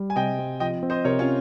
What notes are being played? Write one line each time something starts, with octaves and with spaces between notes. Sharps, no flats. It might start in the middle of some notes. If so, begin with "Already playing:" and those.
Already playing: G3
G#5
C3 D#5 G5
C4
F3 D#5 G5
C4
C5 D#5
C3 A#4 C#5
C#4 F4